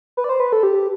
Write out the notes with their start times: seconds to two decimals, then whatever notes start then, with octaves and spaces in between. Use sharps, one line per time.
0.17 B4
0.24 D5
0.29 C5
0.40 B4
0.52 A4
0.63 G4